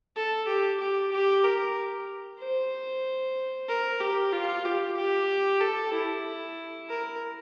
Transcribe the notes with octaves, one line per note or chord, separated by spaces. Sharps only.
A4
G4
G4
G4
A#4
C5
A#4
G4
F4
G4
G4
A4
E4
A#4